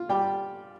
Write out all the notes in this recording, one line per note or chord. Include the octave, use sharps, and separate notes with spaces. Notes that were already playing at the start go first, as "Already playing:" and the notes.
Already playing: F4
G3 G4 G5